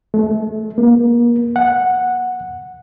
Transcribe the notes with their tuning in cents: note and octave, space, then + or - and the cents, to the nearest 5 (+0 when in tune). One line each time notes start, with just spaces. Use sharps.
A3 -30
A#3 +35
F#5 -10